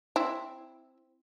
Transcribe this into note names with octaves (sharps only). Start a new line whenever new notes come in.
C4 E4